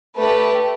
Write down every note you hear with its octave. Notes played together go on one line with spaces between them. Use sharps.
A3 D4 G4 B4